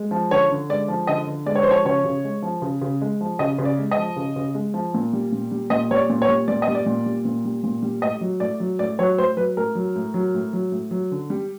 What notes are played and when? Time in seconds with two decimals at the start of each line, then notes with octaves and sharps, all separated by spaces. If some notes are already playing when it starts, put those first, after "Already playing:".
Already playing: G#3
0.11 F3
0.31 D3 C#5
0.51 D3
0.69 G#3 D5
0.88 F3
1.07 D3 D#5
1.27 D3
1.46 G#3 D5
1.55 C#5
1.63 F3 C5
1.71 C#5
1.85 C#3 C#5
2.05 C#3
2.24 G#3
2.42 F3
2.62 C#3
2.82 C#3
3.01 G#3
3.21 F3
3.39 C#3 D#5
3.59 C#3
3.65 D5
3.79 G#3
3.91 D#5
3.97 F3
4.17 C#3
4.36 C#3
4.55 G#3
4.74 F3
4.94 A#2
5.13 G3
5.32 A#2
5.51 G3
5.70 A#2 D#5
5.91 G3 C#5
5.96 D5
6.09 A#2
6.22 C#5
6.28 G3
6.48 A#2 D5
6.62 D#5
6.68 G3
6.75 D5
6.86 A#2
7.06 G3
7.25 A#2
7.45 G3
7.64 A#2
7.82 G3
8.02 A2 D#5
8.21 F#3
8.40 A2 D5
8.60 F#3
8.79 A2 D5
8.99 F#3 C#5
9.18 A2 C5
9.37 F#3 B4
9.57 A2 A#4
9.75 F#3
9.96 A2
10.14 F#3
10.34 A2
10.53 F#3
10.72 A2
10.91 F#3
11.11 D3
11.30 G3